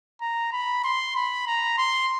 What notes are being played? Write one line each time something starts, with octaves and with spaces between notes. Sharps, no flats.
A#5
B5
C6
B5
A#5
C6